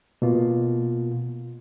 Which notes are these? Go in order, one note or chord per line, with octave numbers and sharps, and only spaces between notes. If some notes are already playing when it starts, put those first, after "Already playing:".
B2 A#3 F4